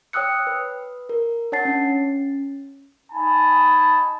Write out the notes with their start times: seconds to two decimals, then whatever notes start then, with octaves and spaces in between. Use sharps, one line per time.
0.13 C#5 G5 D#6 E6 F#6 C#7
0.47 B4
1.09 A#4
1.52 D4 C#5 F#5 A5 A6 C7
1.65 C#4
3.12 D#4 G#5 A5 B5